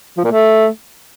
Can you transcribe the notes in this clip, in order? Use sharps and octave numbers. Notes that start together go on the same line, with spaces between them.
F3
A#2
A3